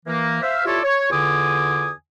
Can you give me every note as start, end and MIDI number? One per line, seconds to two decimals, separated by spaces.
0.06 0.41 52
0.06 0.41 58
0.42 0.63 72
0.42 0.63 76
0.42 0.63 77
0.65 0.79 64
0.65 0.79 65
0.65 0.79 67
0.65 0.79 69
0.65 0.79 73
0.65 0.79 74
0.83 1.09 73
1.10 1.90 40
1.10 1.90 50
1.10 1.90 65
1.10 1.90 80
1.10 1.90 86
1.10 1.90 87